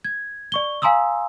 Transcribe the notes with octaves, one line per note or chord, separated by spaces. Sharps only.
G#6
D5 C#6 G7
F5 G#5 A#5 C6 D#6 E6